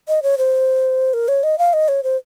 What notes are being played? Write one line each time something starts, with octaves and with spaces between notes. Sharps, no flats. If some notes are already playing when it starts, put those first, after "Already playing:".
D#5
C#5
C5
A#4
C#5
D#5
F5
D#5
C#5
C5